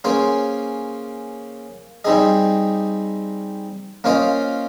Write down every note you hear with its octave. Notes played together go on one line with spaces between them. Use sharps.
A#3 C#4 G#4 C5
G3 C4 D#4 G#4 D#5
A#3 C#4 F4 C5 D#5